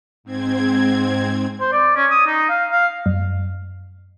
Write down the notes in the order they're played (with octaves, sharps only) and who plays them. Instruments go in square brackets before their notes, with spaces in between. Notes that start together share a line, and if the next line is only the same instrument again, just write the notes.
[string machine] G#2 C4 G#6
[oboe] C5
D5
C#4
D#6
D#4
F5
F5
[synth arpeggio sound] F#2